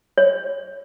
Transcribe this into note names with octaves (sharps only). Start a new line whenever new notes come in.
C#5